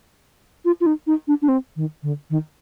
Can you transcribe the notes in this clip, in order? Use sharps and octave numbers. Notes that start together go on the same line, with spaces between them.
F4
F4
D#4
D#4
D4
D4
C4
D#3
D3
D#3